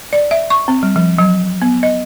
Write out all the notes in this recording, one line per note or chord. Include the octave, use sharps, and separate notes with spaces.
D5
E5
C#6
C4
G3
F3
F#3
B3
D#5